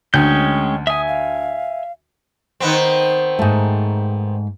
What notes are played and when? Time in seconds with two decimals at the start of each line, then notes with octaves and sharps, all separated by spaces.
0.14 D2 G#3 C#4 G5 G6
0.87 E5 G#5 D#6
1.08 F5
2.60 D#3 B3 C4
3.39 G#2 A3